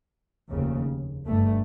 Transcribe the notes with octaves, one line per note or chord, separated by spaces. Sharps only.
F1 D#2 C#3
G1 G2 A3